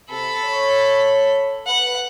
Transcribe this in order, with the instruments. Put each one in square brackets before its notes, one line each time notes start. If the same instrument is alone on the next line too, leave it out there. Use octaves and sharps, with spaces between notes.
[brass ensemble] C3 [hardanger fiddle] A4 B5
[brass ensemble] C#5
[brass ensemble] B4 [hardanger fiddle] F#5